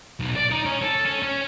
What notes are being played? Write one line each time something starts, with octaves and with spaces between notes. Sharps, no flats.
B1
D5
D#4
C#4
A4
C#4
C#4